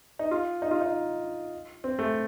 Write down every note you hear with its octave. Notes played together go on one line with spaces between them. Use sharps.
D#4
F4
D#4
F4
D#4
C4
A3